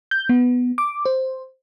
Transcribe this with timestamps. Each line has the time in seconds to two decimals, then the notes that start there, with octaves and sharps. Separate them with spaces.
0.11 G6
0.29 B3
0.78 D6
1.05 C5